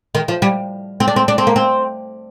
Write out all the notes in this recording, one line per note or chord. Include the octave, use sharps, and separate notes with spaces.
D#3
F3
G3
C4
D4
C4
D4
C4
A#3
C4